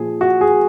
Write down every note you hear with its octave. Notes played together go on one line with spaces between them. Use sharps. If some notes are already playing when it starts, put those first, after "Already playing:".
Already playing: A#2 F3 G#4
F#4
G#4